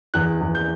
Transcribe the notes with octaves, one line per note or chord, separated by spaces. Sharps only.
E2 F#6
E2
G6